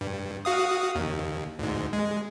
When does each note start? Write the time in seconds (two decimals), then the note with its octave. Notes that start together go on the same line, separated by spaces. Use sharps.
0.01 G2
0.45 F#4 F5 D#6
0.95 D#2
1.59 D2 G#2
1.93 G#3